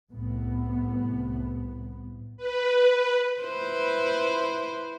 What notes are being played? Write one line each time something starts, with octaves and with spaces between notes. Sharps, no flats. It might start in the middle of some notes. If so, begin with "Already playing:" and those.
C2 A2 B3
B4
E4 B4 C5